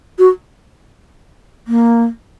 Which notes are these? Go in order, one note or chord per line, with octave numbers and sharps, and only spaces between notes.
F#4
A#3